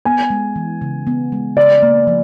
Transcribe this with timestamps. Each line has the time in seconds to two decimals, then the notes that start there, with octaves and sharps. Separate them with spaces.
0.05 B3 G#5
0.30 G#3
0.56 E3
0.82 C#3
1.07 B3
1.32 G#3
1.57 C#3 D5
1.83 A#3
2.07 F3